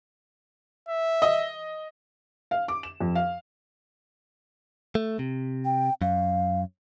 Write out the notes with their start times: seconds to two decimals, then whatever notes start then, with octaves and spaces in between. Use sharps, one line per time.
0.89 E5
1.22 D#5
2.51 F5
2.68 D6
2.83 E7
3.00 F2
3.15 F5
4.95 A3
5.19 C3
5.65 G5
6.02 F#2 F5